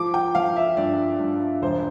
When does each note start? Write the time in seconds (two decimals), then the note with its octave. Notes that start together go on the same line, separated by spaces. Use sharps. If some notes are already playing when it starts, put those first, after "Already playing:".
Already playing: F3 D6
0.14 G5
0.35 F3 F5
0.57 E5
0.77 G2 D5
1.19 G2
1.62 E1 C5